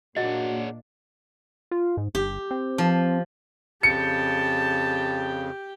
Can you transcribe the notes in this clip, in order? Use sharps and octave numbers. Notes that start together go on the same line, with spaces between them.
A#2 A#3 D4 F#4 G#4 C#5 D#5 F#5
F4
G#2
G1 G4
C4
F3
F2 C#3 G4 G5 A5 C#7